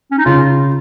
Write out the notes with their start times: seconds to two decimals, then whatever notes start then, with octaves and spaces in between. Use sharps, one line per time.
0.11 C#4
0.18 D#4
0.25 C#3 F4